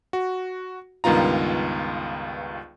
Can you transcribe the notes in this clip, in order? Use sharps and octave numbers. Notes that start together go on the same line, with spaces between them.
F#4
C#2 G2 D#3 B3 F4 A#5